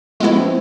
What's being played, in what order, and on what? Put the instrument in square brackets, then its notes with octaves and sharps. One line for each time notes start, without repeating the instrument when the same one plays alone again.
[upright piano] F3 A3 [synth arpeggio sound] G#3 B3 E4
[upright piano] A3 C4